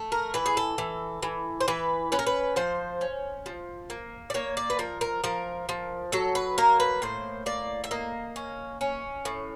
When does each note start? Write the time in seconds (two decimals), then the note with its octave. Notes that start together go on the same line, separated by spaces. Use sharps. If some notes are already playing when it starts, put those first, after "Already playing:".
Already playing: A3
0.12 A#4
0.34 E3 B4
0.46 G#4
0.57 A4
0.78 E3
1.23 E3
1.61 C5
1.68 E3 B4
2.12 C#4 B4
2.19 A#4
2.27 B4
2.56 F3 C5
3.01 C#4
3.46 F3
3.90 A#3
4.30 D5
4.34 A#3 C#5
4.57 D5
4.70 B4
4.79 F3 A#4
5.01 A#4
5.24 F3 A#4
5.69 F3
6.12 F#3 A4
6.35 B4
6.58 A#3 A#4
6.80 B4
7.02 A2 C5
7.46 A#3 D5
7.84 E5
7.91 A#3 D#5
8.36 C#4
8.81 C#4
9.25 A2